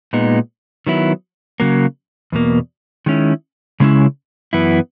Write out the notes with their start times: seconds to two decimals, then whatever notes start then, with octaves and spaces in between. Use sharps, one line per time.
0.13 A#2 G#3 B3 D#4
0.87 D#3 F#3 B3 E4
1.60 C#3 F#3 A#3
2.32 E2 B2 A#3
3.06 D#3 G#3 C#4 E4
3.80 C#3 G#3 C#4 E4
4.53 F#2 E3 B3 E4